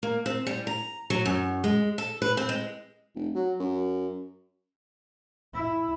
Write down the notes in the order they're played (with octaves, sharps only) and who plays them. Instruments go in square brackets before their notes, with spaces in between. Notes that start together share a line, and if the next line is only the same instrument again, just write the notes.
[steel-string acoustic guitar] A#3
C4
G3
A#5
F#3
F#2
G#3
A4
B4
C4
G#3
[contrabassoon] F1
F#3
F#2
[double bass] E4